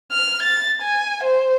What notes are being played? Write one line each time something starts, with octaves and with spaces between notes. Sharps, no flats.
F6
A6
G#5
C5